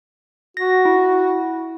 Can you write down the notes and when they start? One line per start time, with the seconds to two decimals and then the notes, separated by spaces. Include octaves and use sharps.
0.57 F#4 A#6
0.85 E4